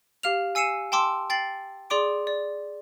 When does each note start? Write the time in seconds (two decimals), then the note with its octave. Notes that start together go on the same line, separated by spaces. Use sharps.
0.23 G4 F5 F6 F7
0.55 G#5 E6 C7 C#7 D#7 E7
0.92 G5 A5 C6 D6 E6
1.30 G5 A6 C7 F#7
1.90 G#4 D5 C6 D6 D7
2.27 D5